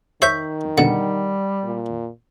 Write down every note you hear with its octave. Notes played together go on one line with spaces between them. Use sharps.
D#3 C5 C#5 E5 C#6 G6 B6
B2 D3 G3 F#5
A#2